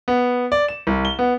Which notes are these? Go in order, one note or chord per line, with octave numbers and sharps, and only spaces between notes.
B3
D5
E7
C2
G7
B3